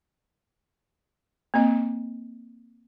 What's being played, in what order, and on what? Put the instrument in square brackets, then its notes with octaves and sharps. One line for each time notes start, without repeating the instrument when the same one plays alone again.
[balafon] A#3 C4 D#5